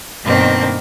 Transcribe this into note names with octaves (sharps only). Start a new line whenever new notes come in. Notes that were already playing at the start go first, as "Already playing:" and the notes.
G2 B2 D#3 A#3 C4 D4